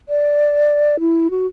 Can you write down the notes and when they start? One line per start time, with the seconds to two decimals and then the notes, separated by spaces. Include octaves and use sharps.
0.09 D5
1.00 E4
1.30 F#4